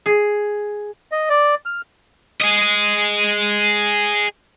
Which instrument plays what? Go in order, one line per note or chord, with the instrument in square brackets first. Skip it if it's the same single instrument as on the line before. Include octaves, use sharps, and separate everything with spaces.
[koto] G#4
[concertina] D#5
D5
F6
[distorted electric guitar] G#4 D#5